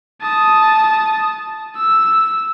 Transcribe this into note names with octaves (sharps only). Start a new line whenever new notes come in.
A5 D#6
E6